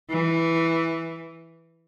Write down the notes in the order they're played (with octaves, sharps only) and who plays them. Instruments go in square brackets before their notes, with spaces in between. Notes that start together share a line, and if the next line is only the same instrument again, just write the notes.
[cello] E3